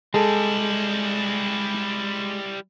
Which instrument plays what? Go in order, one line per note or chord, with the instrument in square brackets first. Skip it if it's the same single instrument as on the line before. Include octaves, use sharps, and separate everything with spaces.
[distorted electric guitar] G3 E4 [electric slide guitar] G#3 [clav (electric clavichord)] G#4 A4